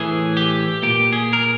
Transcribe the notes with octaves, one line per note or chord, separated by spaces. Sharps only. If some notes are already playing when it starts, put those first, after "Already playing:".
Already playing: A2 E3 G#4
G4
A#2 G4
G#4
A#4